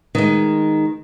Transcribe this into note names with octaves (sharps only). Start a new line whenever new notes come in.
D#3 G#3